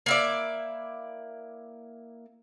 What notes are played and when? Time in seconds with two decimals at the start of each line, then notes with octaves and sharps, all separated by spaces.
0.06 A#3 E4 D5